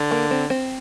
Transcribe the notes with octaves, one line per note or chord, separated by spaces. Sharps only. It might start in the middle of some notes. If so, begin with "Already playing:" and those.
Already playing: D3
A#3
C4
C4